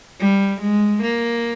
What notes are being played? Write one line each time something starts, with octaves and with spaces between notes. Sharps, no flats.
G3
G#3
A#3